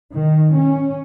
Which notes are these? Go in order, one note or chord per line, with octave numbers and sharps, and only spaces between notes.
D#3
C#4